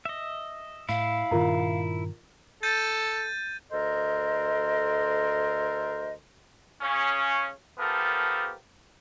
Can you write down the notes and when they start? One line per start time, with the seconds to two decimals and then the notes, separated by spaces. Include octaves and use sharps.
0.05 D#5 E5
0.89 A2 E4 F5
1.31 G2 A#2 D#3 F4 A#4 A#5
2.63 A4 G6 A6 D#7
3.72 D2 A4 A#4 C5 D#5
6.81 C#3 C#4
7.78 F3 B3 G4 A4 A#4